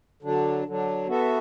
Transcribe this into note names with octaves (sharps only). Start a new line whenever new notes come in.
D3 F#3 D4
D3 F#3 D4
B3 F#4 A4 E5